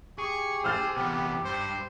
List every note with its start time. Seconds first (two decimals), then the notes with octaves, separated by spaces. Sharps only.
0.18 G4 G#4 C#6
0.64 C5 E6 F6 A6
0.97 E2 C3 B3
1.45 G2 C5